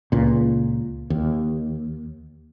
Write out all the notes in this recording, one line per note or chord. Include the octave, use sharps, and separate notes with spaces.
C#2 A#2
D#2